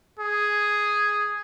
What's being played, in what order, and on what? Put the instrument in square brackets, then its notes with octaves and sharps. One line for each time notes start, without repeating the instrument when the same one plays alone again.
[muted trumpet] G#4